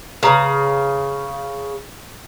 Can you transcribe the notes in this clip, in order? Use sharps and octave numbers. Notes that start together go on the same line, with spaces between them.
C#3 B4 A#5